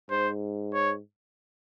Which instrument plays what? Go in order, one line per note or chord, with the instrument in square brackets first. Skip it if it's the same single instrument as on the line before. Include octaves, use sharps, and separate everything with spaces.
[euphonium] G#2 [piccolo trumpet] C5
[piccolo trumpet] C#5